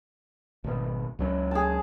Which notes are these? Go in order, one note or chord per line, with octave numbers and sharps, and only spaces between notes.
G#1 B2
C#2 F#3 C#4
G#4 A5